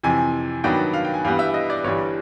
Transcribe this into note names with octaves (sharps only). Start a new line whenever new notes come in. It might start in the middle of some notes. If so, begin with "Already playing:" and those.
F2 C3 E3 G#5
G2 D#3 F#3 B3 D4 G5
F5
G5
G#5
G2 E3 G3 B3 F5
E5
D#5
D5
G1 G2 E3 G3 C#5